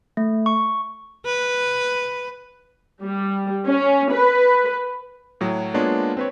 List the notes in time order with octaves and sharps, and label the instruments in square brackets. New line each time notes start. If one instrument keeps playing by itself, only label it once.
[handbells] A3
C#6
[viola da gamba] B4
[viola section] G3
C#4
B4
[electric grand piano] A2 F#3
G#3 A#3 B3 D4 F4 C#5
C4 B4 C#5